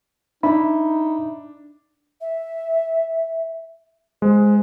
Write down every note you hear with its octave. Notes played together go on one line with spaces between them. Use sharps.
D4 D#4 E5 B5
E5
G#3 C5